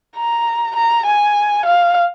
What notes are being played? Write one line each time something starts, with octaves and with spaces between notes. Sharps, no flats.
A#5
A#5
G#5
F5